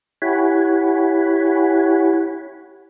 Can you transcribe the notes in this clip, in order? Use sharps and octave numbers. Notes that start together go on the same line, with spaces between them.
E4 G4 C#5 F#5 G#5 B5